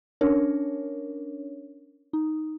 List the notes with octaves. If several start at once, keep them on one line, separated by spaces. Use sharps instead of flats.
C#4 D4 A#4 C#5
D#4